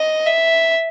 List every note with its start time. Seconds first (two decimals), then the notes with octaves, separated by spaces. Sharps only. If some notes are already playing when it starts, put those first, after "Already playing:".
Already playing: D#5
0.26 E5